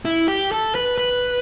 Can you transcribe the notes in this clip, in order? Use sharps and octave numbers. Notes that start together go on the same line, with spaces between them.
E4
G4
A4
B4
B4